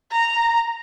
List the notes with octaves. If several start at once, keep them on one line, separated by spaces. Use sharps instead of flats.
A#5